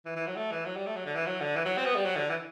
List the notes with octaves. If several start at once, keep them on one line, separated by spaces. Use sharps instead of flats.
E3
E3
F#3
A3
E3
F#3
G3
A3
F#3
D3
E3
F#3
D3
E3
F#3
C4
B3
G3
F#3
D3
E3